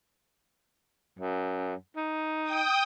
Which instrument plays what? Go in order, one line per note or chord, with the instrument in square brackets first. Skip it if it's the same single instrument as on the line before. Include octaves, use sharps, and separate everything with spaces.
[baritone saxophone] F#2
D#4
[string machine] G5 D#6